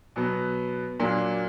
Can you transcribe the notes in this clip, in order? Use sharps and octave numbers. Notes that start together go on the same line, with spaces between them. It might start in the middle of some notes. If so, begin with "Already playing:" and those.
B2 F#3 B3
A#2 F#3 A#3 D4